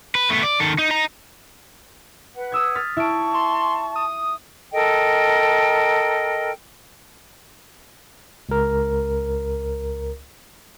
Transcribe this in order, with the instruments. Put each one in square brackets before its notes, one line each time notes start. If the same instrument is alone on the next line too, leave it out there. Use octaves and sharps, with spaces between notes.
[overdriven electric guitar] B4
A3 B3
D5
D#3 A4
D#4
D#5 A#5
[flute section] B4 F#5
[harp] D#6 E6 G#6
F6 A6 B6
[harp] E4 D7 [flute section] A5 C#6
[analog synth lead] C6
D#6
[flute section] A4 A#4 D#5 G5
[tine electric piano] C#2 A#4